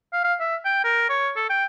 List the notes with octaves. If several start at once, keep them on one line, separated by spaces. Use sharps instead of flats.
F5
F5
E5
G5
A#4
C#5
A4
G5